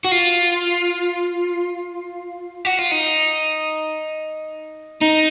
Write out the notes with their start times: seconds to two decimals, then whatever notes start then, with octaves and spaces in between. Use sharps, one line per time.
0.04 F#4
0.11 F4
2.65 F#4
2.79 F4
2.91 D#4
5.02 D#4